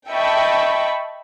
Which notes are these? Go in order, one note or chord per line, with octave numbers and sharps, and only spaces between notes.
D#5 E5 G5 A5 B5 C#6